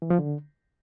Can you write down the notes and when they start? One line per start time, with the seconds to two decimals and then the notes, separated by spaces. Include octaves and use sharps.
0.02 E3
0.10 F3
0.19 D3